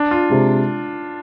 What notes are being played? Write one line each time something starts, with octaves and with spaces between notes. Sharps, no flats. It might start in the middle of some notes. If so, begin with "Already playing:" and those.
Already playing: D4
F4
C3 G#3